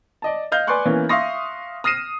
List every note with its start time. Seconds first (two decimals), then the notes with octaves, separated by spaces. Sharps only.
0.22 D5 D#5 A5
0.52 D#5 F5 F6 G6
0.67 B4 D5 G#5 C6 C#6 F#6
0.85 E3 A#3 B3 C#4
1.09 E5 F5 C6 C#6 D#6 A#6
1.84 D#6 F6 A#6 C7 D#7 E7